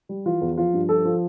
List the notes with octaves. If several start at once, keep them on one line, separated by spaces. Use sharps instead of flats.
G3
E3 F4
E2
F3 F4
G2
F3 A4
F3